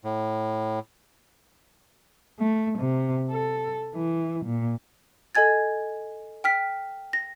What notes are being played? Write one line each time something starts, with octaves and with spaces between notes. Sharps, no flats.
A2
A3
C3
A4
E3
A#2
A4 D#5 G#5 G#6 A6
G5 F6 B6
A#6